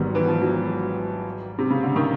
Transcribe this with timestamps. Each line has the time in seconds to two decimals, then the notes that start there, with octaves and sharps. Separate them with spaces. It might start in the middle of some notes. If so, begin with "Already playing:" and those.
Already playing: G#1 G#2 D#3 F#3 G3 B3
0.15 E3
0.28 F3
0.41 F#3
1.58 C3
1.70 C#3
1.83 D3
1.96 D#3